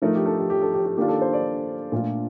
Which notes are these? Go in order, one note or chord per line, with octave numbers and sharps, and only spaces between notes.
F3 A3 D#4 A#4
G4
A4
G4
G4
A4
G4
G4
D#3 A#3 D4 F4 G4
A4
C5
D5
A#2 A3 D4 F4